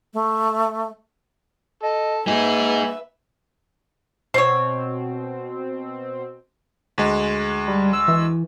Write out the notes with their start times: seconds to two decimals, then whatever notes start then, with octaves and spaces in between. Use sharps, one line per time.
0.14 A3
1.83 A4 D#5
2.27 A#3 D#4 G#4 B4 E5 G#5
4.34 B2 C4 C5 C#5
6.98 D2 G#3
7.68 G3
7.93 E6
8.08 E3